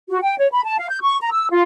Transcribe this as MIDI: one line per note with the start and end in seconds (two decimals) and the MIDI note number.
0.10 0.18 66
0.23 0.37 79
0.39 0.47 73
0.52 0.64 83
0.64 0.77 81
0.78 0.88 77
0.90 0.98 91
1.02 1.18 85
1.21 1.29 82
1.32 1.48 88
1.51 1.62 65